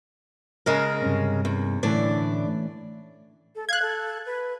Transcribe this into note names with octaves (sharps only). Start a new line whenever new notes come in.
C#3 G#3 A#4
G2 C3 C#4
E2
A2 D3 E3 A3 C#4 D4 E4 D5
A4
F5 F#6 G#6
A4
B4